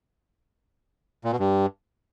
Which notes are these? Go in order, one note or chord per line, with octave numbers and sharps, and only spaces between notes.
A#2
B2
G2